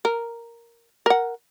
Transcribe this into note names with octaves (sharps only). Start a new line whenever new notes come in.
A#4
A#4 F#5